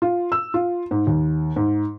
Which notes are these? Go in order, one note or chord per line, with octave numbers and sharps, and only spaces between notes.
F4
E6
F4
G#2
D#2
G#2